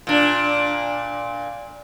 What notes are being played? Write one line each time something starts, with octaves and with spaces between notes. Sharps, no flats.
A#2 D4